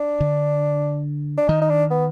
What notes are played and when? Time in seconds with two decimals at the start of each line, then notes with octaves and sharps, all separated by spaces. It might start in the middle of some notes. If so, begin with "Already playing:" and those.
Already playing: D4
0.20 D3
1.37 D4
1.48 D#3 D#4
1.61 D#4
1.69 D4
1.91 B3